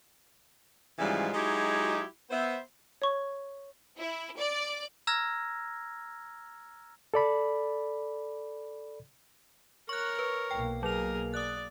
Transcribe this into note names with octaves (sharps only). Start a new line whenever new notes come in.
G#2 C#3 E3 F3 G3 G#3
F#3 G#3 D#4 E4 F#4 G4
B3 C5 E5
C#5 C#6
E4
D5
A#5 E6 F6 G#6 A#6
A4 D5 B5
A#4 C#5 C#6 F#6
B4
B1 A#3 G5
F#3 G#4 A#4 F7
D5 D#6 F#6